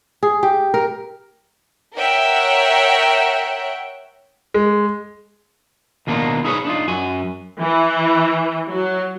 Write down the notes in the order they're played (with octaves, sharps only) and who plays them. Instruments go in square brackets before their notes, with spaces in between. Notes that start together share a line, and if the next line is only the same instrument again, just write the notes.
[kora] G#4
G4
A#4
[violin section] A#4 C#5 E5 F#5 G5
[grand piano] G#3
[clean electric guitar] D#2 B2 A#3 D4 D#4 F4
D#4 E4 G#4 B4 C#5
D4 D#4 F4
F#2 F#4 G#5
[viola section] E3
F#3